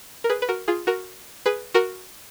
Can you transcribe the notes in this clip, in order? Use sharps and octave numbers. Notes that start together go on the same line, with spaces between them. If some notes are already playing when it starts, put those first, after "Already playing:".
A#4
G#4 B4
B4
F#4 A#4
F4 G#4
F#4 A#4
G#4 B4
F#4 A#4